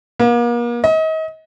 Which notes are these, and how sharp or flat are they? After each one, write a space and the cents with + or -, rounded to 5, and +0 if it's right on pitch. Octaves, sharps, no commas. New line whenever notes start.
A#3 +40
D#5 +35